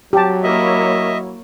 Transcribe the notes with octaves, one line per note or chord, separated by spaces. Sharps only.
F#3 G4 A5
A#3 E4 C#5 D#5 E5